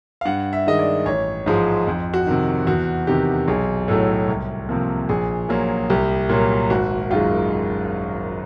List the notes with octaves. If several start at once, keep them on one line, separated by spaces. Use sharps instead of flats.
F5
G2 F#5
E5
D#3 G#3 D#5
D5
A1 C#5
G#2 F3 G#3
F2
F#4
C3 D#3
E2 F#4
C3 D#3 G4
B1 G#4
A2 F#3 A3 A4
C2
C3 F3 A#3
A#1 G#4
A#2 F#3 A#3
C2 G4
A#2 F#3
G#1 F#4
F#2 D#3 G#3 F4